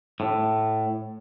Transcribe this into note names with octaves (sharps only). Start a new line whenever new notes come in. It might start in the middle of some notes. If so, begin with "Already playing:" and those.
A2